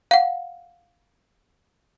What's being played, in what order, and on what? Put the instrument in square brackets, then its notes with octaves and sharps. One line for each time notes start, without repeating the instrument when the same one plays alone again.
[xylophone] F5 F#5